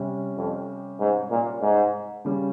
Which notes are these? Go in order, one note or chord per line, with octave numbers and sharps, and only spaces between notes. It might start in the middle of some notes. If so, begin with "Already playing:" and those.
Already playing: C3 G3 C#4 G4
F2
G#2
A#2
G#2
C#3 G3 C#4 G4